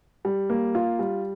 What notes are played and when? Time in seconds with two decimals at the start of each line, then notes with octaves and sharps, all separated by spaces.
0.25 G3
0.50 A#3
0.75 F4
0.99 G3